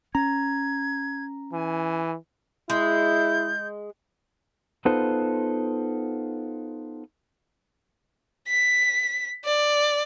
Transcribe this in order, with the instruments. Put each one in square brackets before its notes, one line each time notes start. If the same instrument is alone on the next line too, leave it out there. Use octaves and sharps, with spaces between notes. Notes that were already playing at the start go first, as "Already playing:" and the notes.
[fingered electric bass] C#4 [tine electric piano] A#5 [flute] G#6
[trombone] E3 [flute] G#5
[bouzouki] G#3 [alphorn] E4 [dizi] G6
[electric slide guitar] B3 D#4 F4 A4 B4 C5
[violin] B6
D5